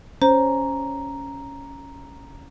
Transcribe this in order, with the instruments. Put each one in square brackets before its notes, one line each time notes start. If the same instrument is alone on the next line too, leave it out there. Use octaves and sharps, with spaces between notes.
[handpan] C#4 [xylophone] C5 [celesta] A#5